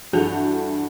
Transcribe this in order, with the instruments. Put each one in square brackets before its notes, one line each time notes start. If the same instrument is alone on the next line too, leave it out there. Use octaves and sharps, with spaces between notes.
[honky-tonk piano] G2 E3 F#4 A4 G6 F7